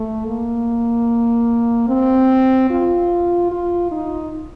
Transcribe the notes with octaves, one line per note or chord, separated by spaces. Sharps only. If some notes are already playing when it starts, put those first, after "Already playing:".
Already playing: A3
A#3
C4
F4
F4
D#4